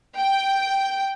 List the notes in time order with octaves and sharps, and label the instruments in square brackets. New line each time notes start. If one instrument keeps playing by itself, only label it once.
[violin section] G5